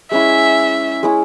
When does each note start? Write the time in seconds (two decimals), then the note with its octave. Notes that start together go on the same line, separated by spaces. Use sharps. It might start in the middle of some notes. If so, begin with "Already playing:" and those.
0.11 G#3 C#4 E4 E5
1.03 G#3 C#4 E4